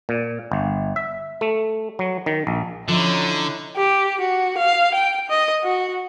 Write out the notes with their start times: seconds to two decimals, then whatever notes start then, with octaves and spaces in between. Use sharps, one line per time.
0.09 A#2
0.52 G1
0.96 E5
1.41 A3
1.99 F#3
2.26 D#3
2.47 A#1
2.88 D3 F3 C#4 D#4 E4
3.76 G4
4.21 F#4
4.57 F5
4.94 G5
5.30 D#5
5.63 F#4